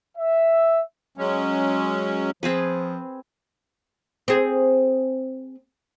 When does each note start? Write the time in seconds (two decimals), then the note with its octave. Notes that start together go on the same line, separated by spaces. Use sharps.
0.18 E5
1.18 F#3 G#3 C#4
2.43 F3 C4 G#4 B4
4.28 C4 G#4